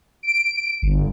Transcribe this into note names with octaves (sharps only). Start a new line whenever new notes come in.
D7
G1